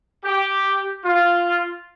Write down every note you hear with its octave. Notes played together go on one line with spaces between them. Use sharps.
G4
F4